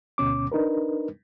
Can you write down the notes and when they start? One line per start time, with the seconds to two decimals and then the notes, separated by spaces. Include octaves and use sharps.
0.18 D2 B2 C#4 D6
0.52 D4 D#4 A#4 B4